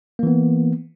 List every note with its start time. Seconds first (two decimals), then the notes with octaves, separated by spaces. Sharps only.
0.19 A#3
0.23 E3
0.27 B3